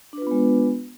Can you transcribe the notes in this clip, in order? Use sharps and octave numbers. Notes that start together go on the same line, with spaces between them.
G#3 B3 D4 F4 B4